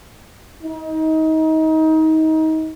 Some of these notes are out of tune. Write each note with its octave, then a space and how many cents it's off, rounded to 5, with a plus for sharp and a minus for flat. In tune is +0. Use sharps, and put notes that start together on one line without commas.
D#4 +25